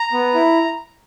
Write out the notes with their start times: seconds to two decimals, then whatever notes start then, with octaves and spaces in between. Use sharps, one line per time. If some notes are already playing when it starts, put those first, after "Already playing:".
Already playing: A#5
0.13 B3
0.34 E4